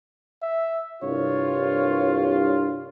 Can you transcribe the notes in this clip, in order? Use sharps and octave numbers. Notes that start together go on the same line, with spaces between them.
E5
C2 G2 F4 C#5